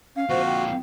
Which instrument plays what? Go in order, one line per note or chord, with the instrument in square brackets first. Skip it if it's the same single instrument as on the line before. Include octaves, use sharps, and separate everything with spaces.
[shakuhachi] C#4 [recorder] F5
[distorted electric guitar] F2 A#2 [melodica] F#4 [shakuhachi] C5
[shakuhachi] G5